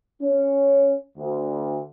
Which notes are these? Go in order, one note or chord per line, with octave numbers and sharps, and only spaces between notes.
C#4
D2